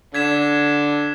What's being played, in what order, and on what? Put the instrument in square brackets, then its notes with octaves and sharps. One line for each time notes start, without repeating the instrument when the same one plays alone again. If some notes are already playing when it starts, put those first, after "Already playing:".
[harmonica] D3 [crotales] G#6 B6 E7